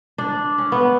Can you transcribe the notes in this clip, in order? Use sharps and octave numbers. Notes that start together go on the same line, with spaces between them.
D4
C#4
B3